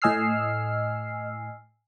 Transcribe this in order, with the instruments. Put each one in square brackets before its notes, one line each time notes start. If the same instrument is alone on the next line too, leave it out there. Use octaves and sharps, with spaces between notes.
[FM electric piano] A2 D#5 G#5 E6 F6 C7